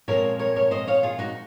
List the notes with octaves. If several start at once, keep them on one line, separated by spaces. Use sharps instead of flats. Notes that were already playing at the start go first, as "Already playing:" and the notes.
A#2 F3 G#3 C4 A#4 C#5
A#4 C#5
A#4 C#5
C5 D#5
C#5 F5
F4 G#4
D#4 F#4